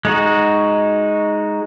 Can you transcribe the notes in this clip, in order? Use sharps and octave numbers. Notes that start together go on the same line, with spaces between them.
G#3 D#4 F#4